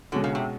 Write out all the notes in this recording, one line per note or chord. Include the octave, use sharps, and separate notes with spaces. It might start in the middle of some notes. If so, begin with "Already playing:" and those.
B2 D3 G#3 C#4 F#4
C#3
C3